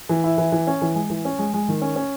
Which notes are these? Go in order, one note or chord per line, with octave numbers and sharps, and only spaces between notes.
E3
E4
E3
E3
C#4
E3
G#3
E3
C#4
G#3
G#3
D#3
C#4
C#4